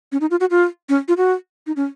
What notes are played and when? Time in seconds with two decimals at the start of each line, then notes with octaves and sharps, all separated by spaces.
0.12 C#4
0.21 D#4
0.31 F4
0.40 F#4
0.50 F4
0.89 C#4
1.08 F4
1.17 F#4
1.67 D#4
1.76 C#4